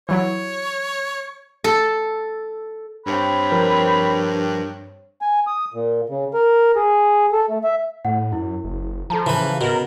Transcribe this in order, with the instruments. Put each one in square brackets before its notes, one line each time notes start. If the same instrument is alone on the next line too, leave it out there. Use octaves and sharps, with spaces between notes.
[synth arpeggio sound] E3 F#3 E4 [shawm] C#5
[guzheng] A4
[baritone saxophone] G2 [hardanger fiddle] C4 C#5 [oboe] B5
[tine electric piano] F3 A#4 B4
[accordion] G#5
D#6
A#2
C#3
A#4
G#4
A4
A3
E5
[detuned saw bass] A2 [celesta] F#5
[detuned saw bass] F#2 [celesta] E4
[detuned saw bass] F#1
[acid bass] F3 [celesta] A4 A5 A#5
[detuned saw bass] C#3 [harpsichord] E3 B4
[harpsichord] B2 [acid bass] A#4